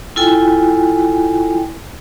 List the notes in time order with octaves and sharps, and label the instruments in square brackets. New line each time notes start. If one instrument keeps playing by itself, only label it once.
[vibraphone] E4 F4 A4 G5 G#5